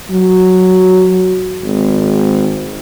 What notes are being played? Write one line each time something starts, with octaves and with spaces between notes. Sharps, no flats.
F#3
G#1